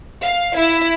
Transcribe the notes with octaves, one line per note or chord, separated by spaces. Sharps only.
F5
E4